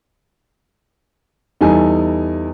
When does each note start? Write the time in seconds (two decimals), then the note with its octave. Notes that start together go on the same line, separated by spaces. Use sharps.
1.61 E2 G3 D#4 A4 G#5